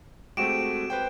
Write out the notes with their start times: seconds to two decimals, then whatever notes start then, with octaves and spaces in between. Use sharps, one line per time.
0.37 G#3 A3 C4 F#4 G4 D7 E7
0.90 B4 C5 G5